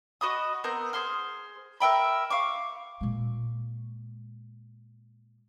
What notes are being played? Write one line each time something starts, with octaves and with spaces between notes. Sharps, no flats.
F#4 D#5 B5 D#6
B3 C4 A#4 G6
G#4 C5 C6 F6
A#4 E5 G5 B5
F5 C#6 D6
A#2 G#3